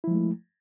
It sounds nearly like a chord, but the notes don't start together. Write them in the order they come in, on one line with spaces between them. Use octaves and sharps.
E4 F3 G#3 A3